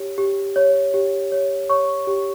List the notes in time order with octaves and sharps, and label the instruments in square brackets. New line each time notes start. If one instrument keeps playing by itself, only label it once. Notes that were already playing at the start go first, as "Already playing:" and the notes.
Already playing: [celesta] G4 C#5
G4
C#5
G4
C#5
C#5 C#6
G4